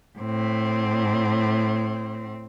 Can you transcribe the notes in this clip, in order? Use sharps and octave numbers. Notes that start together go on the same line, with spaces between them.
A2 C4